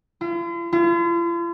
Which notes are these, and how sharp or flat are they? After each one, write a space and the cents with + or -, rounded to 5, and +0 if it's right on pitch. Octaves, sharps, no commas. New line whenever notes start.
F4 -45
F4 -45